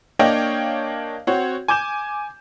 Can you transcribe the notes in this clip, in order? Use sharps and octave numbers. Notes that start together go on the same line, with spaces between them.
A#3 D4 C#5 D#5 F5 G5
C4 F#4 C#5
G#5 D6 G6 E7